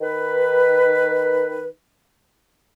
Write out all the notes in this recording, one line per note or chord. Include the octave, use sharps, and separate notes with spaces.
D#3 B4